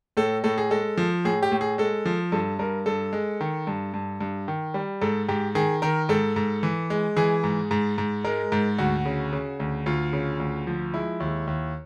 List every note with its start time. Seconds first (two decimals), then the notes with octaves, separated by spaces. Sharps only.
0.17 A2 A4
0.44 A2 A4
0.58 G#4
0.71 G#3 A4
0.97 F3
1.25 A2 G#4
1.43 G4
1.52 A2
1.61 G#4
1.78 G#3 A4
2.05 F3
2.32 G2 A4
2.59 G2 A#4
2.86 G2 A4
3.13 G#3
3.41 D#3
3.67 G2
3.94 G2
4.21 G2
4.48 D#3
4.74 G3
5.01 G#2 A4
5.28 G#2 G4
5.55 D#3 G#4
5.82 D#3 A#4
6.09 G#2 A4
6.36 G#2
6.63 E3
6.90 G#3
7.17 E3 G#4
7.44 G#2
7.71 G#2
7.98 G#2
8.24 G#3 A#4
8.52 G#2
8.78 D2 F#4
9.05 C#3
9.33 C#3
9.60 D2
9.86 D2 F4
10.13 C#3
10.40 D2
10.67 F3
10.94 G#3 E4
11.20 D#2
11.47 D#2